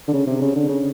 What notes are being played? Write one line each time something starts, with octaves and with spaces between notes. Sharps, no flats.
D3
C#3
C3
C#3
D3
C#3